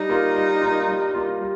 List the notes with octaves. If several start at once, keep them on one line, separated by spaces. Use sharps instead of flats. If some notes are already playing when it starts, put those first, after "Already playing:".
Already playing: G3 D#4
A#3 F4
G3
A#3 F4
G3
A#3 F4
G3